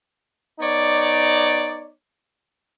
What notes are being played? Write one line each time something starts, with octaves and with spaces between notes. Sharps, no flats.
B3 D#4 C#5 D5